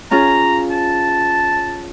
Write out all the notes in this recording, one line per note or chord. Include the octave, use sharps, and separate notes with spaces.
C#4 F4 G#4 A#5
A5